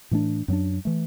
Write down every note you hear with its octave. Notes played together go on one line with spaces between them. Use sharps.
A2 E3 A3 D4
F#2 F#3 B3 D4
E3 A3